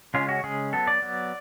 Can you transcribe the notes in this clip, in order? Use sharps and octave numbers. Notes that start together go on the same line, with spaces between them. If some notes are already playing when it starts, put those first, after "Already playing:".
C#3 G#3 C#4 F4
F#4
C#3 G#3 C#4 G#4
F#3 B3 A4
D5
F#3 B3